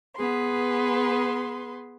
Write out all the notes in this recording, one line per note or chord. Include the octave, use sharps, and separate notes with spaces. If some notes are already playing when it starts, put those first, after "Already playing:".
B3 G#4 B4 C6